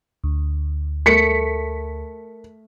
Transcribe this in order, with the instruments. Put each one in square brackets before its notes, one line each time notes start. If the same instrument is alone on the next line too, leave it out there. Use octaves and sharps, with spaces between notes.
[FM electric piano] D2
[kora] A3 [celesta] A#4 [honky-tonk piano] B6 C#7